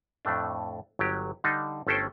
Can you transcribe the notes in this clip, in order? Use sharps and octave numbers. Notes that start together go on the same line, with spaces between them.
F2 A2 A3 D4
G1 F#3 G4
D3 G3 D4 D#4
G1 A3 C#4 A4 C5 G5